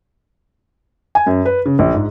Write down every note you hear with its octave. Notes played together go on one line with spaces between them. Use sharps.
G#5
F#2
B4
C#3
A#1
G#2